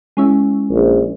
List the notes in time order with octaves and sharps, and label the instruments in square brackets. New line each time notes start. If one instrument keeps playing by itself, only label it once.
[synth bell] G#3 C#4 E4
[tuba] A#1